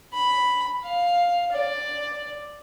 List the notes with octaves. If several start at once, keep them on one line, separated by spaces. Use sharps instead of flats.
B5
F5
D5